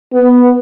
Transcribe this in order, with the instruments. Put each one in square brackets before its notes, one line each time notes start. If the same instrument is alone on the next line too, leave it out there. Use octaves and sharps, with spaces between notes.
[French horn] B3